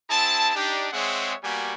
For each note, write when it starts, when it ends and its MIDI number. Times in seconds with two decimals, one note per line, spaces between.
0.10 0.54 60
0.10 0.54 64
0.10 0.54 68
0.10 0.54 81
0.55 0.88 62
0.55 0.88 63
0.55 0.88 67
0.93 1.34 56
0.93 1.34 60
0.93 1.34 68
0.93 1.34 73
0.93 1.34 76
0.93 1.34 78
1.43 1.74 55
1.43 1.74 58
1.43 1.74 59
1.43 1.74 66
1.43 1.74 67
1.43 1.74 80